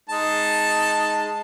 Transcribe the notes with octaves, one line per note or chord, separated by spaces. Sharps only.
G#3 D#4 A5